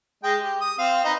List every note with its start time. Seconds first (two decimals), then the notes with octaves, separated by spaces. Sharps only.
0.24 G#3 D#5 G5
0.41 G4
0.61 D#6
0.79 C4 F5
1.04 D#4 B4 D#5